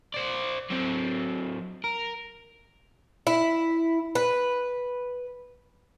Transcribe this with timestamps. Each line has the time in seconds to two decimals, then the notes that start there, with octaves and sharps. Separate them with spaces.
0.14 C5 D5
0.70 F#3 C4
1.84 A#4
3.27 E4
4.15 B4